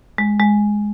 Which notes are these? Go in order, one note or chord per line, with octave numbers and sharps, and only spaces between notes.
G#3
G#3